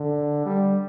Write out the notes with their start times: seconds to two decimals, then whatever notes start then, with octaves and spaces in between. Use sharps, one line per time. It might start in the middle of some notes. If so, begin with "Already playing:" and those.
Already playing: D3
0.46 G3